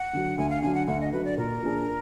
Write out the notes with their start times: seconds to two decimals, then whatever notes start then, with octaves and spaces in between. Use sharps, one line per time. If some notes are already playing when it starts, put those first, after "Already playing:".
Already playing: F#5
0.13 D3 F#3
0.38 D2 G#5
0.50 F5
0.62 D3 F#3 G#5
0.75 F#5
0.87 D2 F#5
1.01 D#5
1.12 D3 F#3 B4
1.24 D5
1.37 A#2 A#4
1.62 F3 A#3 D4 G#4